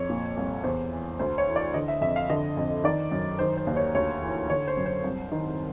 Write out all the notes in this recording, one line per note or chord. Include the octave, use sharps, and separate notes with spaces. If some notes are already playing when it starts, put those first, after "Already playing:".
Already playing: F2 C#5
A#2
C2
E2 C5
E3
D2 C5
C#5
E3
D5
D3 D#5
E5
F2 E5
F5
D3 D#5
F2
D#3 D5
F#2
D#3 C5
C5
D#2
C#5
D2 C#5
E3
D3 C#5
C5
F#2
C5
C2
D#3